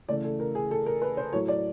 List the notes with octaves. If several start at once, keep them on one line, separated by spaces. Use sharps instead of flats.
C#3 E3 A3 D5
A4
A#4
G#4
A4
A#4
B4
C5
A2 F#3 A3 C#5
D5